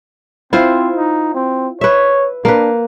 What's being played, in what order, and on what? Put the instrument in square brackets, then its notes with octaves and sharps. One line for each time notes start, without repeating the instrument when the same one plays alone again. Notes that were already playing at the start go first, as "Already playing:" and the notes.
[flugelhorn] C4 [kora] E4 F4 C5
[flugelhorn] D#4
C4
[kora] B4 E5 [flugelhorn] C#5
[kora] A#3 B4 [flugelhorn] D4